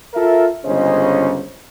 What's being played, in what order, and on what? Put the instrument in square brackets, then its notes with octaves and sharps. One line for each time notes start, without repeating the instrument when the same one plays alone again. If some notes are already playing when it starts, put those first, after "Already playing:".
[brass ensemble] F4 A4 A#4 E5
G1 C#2 C#3 C#4 C5 D#5